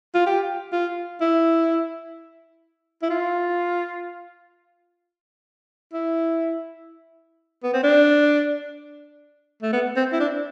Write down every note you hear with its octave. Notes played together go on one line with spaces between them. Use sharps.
F4
G4
F4
E4
E4
F4
E4
B3
C4
D4
A3
B3
C4
E4
D4